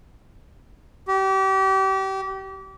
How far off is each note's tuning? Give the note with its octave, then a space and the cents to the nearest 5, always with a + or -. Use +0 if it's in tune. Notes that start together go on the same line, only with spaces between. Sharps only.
G4 -30